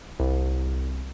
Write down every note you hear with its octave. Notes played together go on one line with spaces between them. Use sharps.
C2